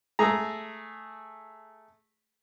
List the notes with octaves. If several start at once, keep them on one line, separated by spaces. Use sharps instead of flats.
A3 G#4 A#5